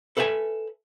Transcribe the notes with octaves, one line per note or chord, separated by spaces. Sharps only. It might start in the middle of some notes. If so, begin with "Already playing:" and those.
A4 B4 E5 G5 G#5